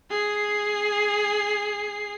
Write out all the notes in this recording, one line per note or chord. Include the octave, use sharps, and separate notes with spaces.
G#4 C7